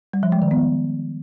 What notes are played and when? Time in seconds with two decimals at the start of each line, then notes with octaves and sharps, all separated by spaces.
0.13 G3
0.23 F3
0.32 G#3
0.42 D#3
0.51 B3